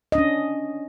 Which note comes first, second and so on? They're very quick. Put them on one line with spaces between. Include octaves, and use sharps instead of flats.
D#5 D4 C#4